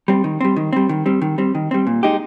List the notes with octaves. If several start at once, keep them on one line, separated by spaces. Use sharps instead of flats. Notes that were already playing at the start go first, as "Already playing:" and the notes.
G3 C4
D#3
G3 C4
D#3
G3 C4
D#3
G3 C4
D#3
G3 C4
D#3
G3 C4
A#2
G#3 D#4 G4